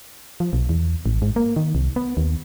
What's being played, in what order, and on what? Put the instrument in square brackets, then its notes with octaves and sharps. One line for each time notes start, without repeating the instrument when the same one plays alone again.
[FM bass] F3
B1
E2
A1
G#2
A#3
D#3
C2
B3
D#2